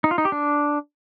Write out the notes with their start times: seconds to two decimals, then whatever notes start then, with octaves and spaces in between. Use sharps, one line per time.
0.04 D#4
0.11 F4
0.18 D#4
0.25 G4
0.32 D4